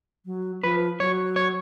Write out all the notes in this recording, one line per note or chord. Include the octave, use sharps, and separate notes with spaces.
F#3
F3 B4
F#3 C#5
C#5